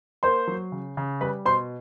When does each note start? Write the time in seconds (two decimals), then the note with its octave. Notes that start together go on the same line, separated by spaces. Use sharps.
0.23 A#3 C5 C6
0.47 F#3
0.72 C#3
0.97 C#3
1.21 G3 B4 B5
1.45 B2 C5 C6